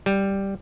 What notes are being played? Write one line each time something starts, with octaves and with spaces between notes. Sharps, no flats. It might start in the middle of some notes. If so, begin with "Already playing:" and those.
G3